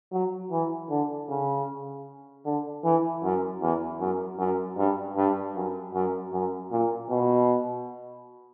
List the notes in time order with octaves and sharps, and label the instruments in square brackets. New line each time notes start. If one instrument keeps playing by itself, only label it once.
[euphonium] F#3
E3
D3
C#3
D3
E3
F#2
E2
F#2
F#2
G2
G2
F#2
F#2
F#2
A#2
B2